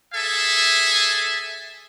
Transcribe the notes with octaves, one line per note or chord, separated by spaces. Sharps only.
G#4 A4 E5 G#5